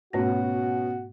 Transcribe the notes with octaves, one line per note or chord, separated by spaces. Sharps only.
G#2 B2 A3 B3 C#4 F#4 A#6